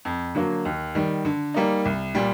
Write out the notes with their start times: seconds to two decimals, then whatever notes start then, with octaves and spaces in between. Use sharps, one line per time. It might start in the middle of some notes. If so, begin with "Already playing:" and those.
0.05 F2
0.35 D3 F#3 A#3
0.65 D#2
0.95 D#3 G3
1.25 D3
1.54 G3 A#3 D#4
1.85 C2
2.15 A#2 G3